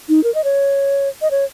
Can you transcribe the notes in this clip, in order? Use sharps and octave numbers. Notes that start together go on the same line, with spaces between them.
D#4
A#4
D#5
C#5
D#5
C#5